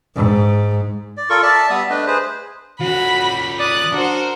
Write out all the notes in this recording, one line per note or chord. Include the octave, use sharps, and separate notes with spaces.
G#2
D5
F4 A4 A#4 C#6
D5 E5 A5
G3 B3 E5 D#6
A3 D4 B4 D#5
G#4 B4 C5
F3 C#4 F#4 B5
D5 D#6 F#6
D4 F#4 A#4 C5